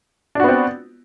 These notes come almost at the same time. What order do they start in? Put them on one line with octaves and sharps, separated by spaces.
D4 F#4 B3 C4